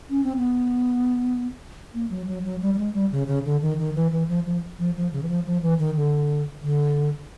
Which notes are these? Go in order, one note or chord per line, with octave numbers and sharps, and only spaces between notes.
C#4
C4
B3
A#3
F#3
F#3
F#3
G3
G3
G#3
G3
C#3
C#3
D3
D#3
D#3
E3
E3
F3
F3
F3
F3
C#3
E3
F3
F3
E3
D#3
D3
D3